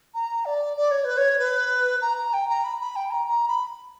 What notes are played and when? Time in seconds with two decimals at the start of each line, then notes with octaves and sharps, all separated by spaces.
0.14 A#5
0.45 D5
0.76 D5
0.90 C#5
1.04 B4
1.17 C#5
1.39 B4
2.01 A#5
2.17 A#5
2.33 G5
2.48 A#5
2.64 B5
2.80 B5
2.95 G5
3.10 A#5
3.27 A#5
3.48 B5